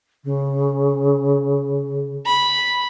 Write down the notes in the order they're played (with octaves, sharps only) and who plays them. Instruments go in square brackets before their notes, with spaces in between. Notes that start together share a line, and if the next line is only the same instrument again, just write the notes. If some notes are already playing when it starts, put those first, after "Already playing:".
[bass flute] C#3
[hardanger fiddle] B5